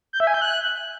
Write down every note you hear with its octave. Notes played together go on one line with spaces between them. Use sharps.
G6
E5
G#5
G6
F#6